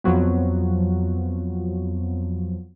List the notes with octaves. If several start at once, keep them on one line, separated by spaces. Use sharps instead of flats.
F2 F3 F#3 B3